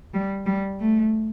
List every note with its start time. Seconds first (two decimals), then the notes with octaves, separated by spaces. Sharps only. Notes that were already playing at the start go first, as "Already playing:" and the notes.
0.14 G3
0.46 G3
0.80 A3